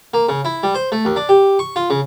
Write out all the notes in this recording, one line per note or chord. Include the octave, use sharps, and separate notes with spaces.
A#3
C#3
E4
G3
C5
A3
D#2
D4
G4
C#6
F4
C#3